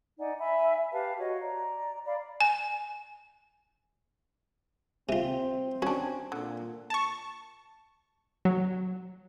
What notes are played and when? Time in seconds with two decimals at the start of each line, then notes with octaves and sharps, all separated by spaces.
0.19 D#4 D5 F#5 G#5
0.38 E5 G#5 B5
0.92 G4 B4 F5 A5
1.18 F#4 C#5 D#5
1.41 D5 A#5
2.06 D5 F5 B5
2.41 G#5
5.09 C3 C4 F4
5.82 C#4 D4 F#4
6.32 A#2 D3
6.90 A5 C#6
8.45 F#3